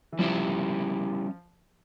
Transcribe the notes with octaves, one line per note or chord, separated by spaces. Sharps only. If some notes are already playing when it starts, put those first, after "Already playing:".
E3
F3 G3 C#4 E4 G4